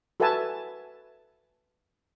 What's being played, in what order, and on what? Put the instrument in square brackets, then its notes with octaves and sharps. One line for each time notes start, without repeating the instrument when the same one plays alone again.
[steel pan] F#4 A4 B4 E5 G#5 A5